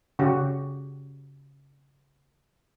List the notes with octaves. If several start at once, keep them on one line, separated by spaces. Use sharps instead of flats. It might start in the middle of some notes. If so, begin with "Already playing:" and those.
C#3 F#4 G4